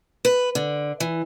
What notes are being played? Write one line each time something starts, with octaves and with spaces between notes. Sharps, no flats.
B4
D3
E3